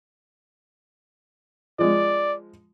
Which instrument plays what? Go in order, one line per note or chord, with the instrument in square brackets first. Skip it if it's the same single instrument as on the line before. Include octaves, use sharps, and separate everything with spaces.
[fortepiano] F3 G#3 [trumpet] D5